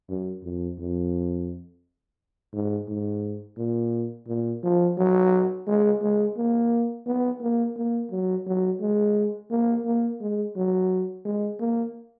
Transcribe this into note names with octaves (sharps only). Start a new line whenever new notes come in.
F#2
F2
F2
G#2
G#2
A#2
A#2
F3
F#3
G#3
G#3
A#3
B3
A#3
A#3
F#3
F#3
G#3
A#3
A#3
G#3
F#3
G#3
A#3